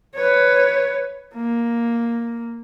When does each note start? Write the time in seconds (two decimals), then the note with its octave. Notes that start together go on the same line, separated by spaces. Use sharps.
0.15 B4 C#5
1.35 A#3